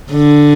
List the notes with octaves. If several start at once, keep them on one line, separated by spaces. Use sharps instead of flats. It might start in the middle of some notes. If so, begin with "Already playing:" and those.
D3